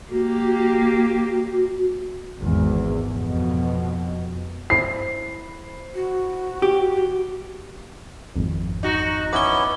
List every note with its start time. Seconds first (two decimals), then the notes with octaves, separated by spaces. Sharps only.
0.11 A#3 F#4 G4
2.39 G#1 E2
3.12 F2 B2
4.70 E4 C5 B5 C7
5.95 F#4
6.62 G4
8.36 G#1 F2
8.83 D#4 F#4
9.33 B3 C#4 E4 B4 D6 G7